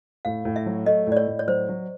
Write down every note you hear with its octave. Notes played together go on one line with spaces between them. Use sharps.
A2 F5
A2
E5
F#3
A3 D#5
A2 D5
C#5
A2
C#5
F#3 C5
F#3